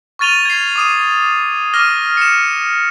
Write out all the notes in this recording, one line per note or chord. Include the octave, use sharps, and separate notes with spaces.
C#6 F6 A6 D#7 F7 G7
G#6 C7
D6 D#6 D#7
D6 F6 A#6 D#7 G7
C#7 E7